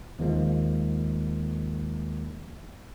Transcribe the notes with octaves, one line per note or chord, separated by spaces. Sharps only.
D#2 D#3 F3 G#3 A#3